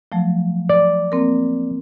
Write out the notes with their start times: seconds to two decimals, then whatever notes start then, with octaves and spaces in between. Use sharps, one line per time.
0.12 F3 F#3 A3
0.69 D5
1.12 A#3 C4 A#4